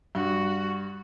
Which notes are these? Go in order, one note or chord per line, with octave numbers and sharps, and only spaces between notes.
G2 F#4